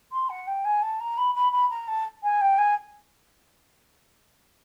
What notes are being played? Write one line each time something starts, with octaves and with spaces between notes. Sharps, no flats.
C6
F#5
G5
G#5
A5
A#5
B5
B5
B5
A#5
A5
G#5
G5
G#5